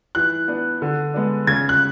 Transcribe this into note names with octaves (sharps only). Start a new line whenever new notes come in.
E3 F#6
B3 D4
D3
G#3 B3 D4
C#3 G#6
F#6